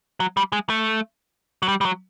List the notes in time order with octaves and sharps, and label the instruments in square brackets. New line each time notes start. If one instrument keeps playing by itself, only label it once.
[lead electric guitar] F#3
G3
G#3
A3
F#3
G3
G3
F#3